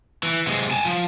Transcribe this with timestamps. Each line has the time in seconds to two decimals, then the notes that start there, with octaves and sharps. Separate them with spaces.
0.23 E3
0.47 C3 G#3
0.71 G#5 A5
0.85 F3